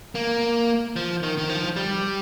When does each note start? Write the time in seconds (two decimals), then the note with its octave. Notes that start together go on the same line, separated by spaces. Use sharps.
0.15 A#3
0.96 F3
1.23 D#3
1.38 D#3
1.49 F3
1.76 G3